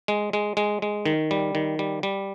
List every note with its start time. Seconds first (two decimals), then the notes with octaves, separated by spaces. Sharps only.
0.08 G#3
0.33 G#3
0.57 G#3
0.82 G#3
1.06 D#3
1.31 G3
1.55 D#3
1.79 G3
2.03 G3